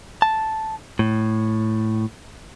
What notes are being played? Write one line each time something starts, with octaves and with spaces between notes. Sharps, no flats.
A5
A2